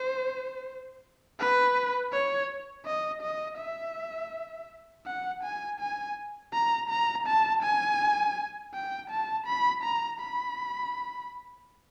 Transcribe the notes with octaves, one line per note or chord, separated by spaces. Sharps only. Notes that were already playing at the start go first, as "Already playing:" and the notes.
Already playing: C5
B4
C#5
D#5
D#5
E5
F#5
G#5
G#5
A#5
A#5
A5
G#5
G5
A5
B5
A#5
B5